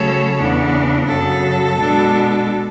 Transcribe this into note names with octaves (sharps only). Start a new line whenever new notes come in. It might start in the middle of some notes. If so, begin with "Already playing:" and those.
Already playing: C#3 F#3 A3 A4 C#5
E2 C#3 E3 B3 D4
F#2 C#3 F#3 A4
B2 G#3 D4